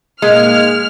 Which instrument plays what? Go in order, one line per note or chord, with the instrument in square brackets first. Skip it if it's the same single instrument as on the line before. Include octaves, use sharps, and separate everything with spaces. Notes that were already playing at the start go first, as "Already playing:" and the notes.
[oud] A#2 D#3 A#3 [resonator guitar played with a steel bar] G#3 [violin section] F6